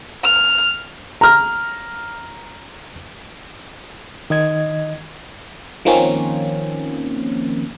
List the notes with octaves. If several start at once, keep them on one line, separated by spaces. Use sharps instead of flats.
F6
A#5 F6
D#3 D#5 G#6
D#3 F3 A#3 C4 C#4